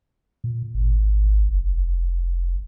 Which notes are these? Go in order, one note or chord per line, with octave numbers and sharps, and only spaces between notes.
A#2
G#1
F1